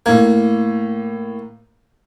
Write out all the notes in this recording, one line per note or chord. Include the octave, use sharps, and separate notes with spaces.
A2 A#3 G#6